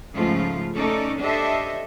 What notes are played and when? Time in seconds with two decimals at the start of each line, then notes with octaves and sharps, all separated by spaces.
0.15 G#2 C#3 F3 A3 F4
0.76 A3 C#4 D#4 A4 D5
1.20 D4 G4 A4 C5 D#5 E5